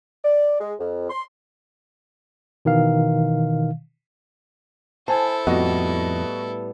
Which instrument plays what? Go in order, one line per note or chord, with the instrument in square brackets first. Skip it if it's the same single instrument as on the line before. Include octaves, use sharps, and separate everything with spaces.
[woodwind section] D5
G#3
F2
C6
[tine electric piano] B2 D#3 E3 F5
[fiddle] E4 A4 [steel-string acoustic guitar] C5 [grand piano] G#5 A5
[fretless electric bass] F2 [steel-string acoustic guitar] A2 G3 B3 [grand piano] F#4 D#5